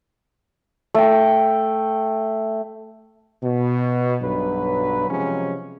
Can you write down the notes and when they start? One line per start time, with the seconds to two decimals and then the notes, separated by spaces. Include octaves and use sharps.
0.94 A3 G5
3.44 B2
4.22 B1 G2 F#3 B4
5.10 C3 F3 F#3 G#3 C#4